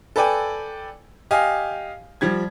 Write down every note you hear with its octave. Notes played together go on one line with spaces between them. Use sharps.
A4 B4 D5 G5 G#5
G4 D#5 F5 G#5
F3 G3 G#6